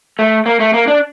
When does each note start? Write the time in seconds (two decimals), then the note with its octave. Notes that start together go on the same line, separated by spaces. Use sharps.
0.19 A3
0.46 A#3
0.60 A3
0.74 A#3
0.87 D4